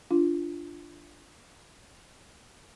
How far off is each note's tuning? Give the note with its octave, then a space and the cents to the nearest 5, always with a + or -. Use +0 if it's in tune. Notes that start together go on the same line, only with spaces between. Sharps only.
D4 +0 F4 -15